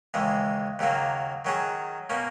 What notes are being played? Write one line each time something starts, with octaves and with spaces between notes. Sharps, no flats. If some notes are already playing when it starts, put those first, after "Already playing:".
D#2 C#3 E3 G#3
D#2 C#3 F#3 A#3
D#3 F#3 C#4 G#4
B2 A#3 C#4